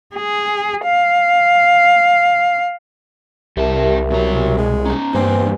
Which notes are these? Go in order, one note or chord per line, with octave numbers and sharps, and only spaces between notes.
G#4
F5
C2 G3 G4 A#4 E5 A5
B2 F#3 A#5
G#3
C#4 D#4 A#5
E2 G2 A#3 C4 B4 G#5